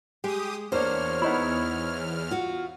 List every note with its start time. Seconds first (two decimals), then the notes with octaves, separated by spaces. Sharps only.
0.24 G#3 G4 D#6
0.72 E2 A#3 D4 C5 C#5 F6
1.22 B3 D#4 E4
2.31 F4 F#4